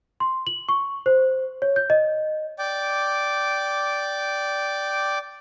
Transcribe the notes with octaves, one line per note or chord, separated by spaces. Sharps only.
C6
F#7
C#6
C5
C#5
G6
D#5
D5 G5 D6